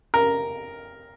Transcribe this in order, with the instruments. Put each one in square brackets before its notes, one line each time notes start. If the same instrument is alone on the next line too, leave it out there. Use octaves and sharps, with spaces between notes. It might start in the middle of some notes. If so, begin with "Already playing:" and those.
[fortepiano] A#4